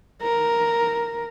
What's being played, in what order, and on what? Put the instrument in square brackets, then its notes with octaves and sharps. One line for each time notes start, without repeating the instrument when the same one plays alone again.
[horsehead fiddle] A#4